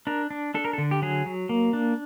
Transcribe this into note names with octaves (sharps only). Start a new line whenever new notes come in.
D4 A#4
D4
D4 A4
A#4
A4
D3
G4
F#3 G#4
F#3
A#3
D4